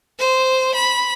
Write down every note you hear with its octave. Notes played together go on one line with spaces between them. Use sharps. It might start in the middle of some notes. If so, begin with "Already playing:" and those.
C5
B5